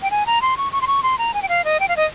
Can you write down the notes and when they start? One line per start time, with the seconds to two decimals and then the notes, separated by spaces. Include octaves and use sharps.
0.02 G5
0.11 G#5
0.26 A#5
0.42 C6
0.57 C#6
0.72 C#6
0.82 C6
0.87 C#6
1.03 C6
1.18 A#5
1.34 G#5
1.42 G5
1.49 F5
1.65 D#5
1.80 G5
1.89 F5
1.97 D#5